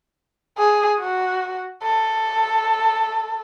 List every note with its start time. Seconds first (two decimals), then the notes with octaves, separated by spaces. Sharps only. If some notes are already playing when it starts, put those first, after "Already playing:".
0.58 G#4
1.00 F#4
1.83 A4